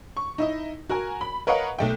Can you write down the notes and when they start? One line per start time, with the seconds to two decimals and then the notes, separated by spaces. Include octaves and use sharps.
0.17 C#6
0.38 D#4 E4 D#5
0.89 F#4 A#4 G#5
1.21 B5
1.47 A#4 B4 C#5 D#5 F5 F#5
1.79 B1 A3 G5